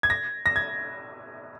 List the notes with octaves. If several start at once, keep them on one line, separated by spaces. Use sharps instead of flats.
G#6
A#6
A#6
G#6